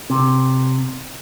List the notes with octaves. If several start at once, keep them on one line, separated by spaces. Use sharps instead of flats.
C3